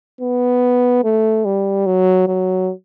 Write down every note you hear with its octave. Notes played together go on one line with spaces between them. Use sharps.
B3
A3
G3
F#3
F#3